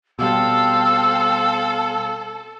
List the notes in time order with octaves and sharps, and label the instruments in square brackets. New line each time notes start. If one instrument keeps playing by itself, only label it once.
[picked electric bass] B2 G3 [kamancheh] C4 F5 [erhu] A4 [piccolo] E6